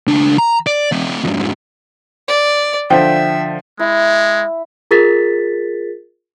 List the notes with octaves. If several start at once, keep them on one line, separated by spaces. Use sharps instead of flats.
C#2 D4
A#5
D5
A3 C4
F2 G#2
D5
D3 F3 E5 G5
G#3 E4
F4 G#4 A#4 A6 B6